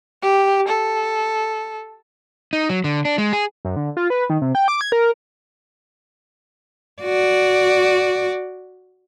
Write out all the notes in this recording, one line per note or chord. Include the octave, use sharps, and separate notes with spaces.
G4
A4
D#4
F#3
D3
D4
G#3
G#4
F#2
D3
F4
B4
D#3
C3
G5
D6
G#6
A#4
F#4 D5